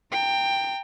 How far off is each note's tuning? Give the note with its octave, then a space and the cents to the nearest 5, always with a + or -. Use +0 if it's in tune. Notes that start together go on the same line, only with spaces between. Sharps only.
G5 +10 A#5 -35